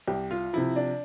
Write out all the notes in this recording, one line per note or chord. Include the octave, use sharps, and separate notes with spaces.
C2 G4
F4
C3 F3 E4
D4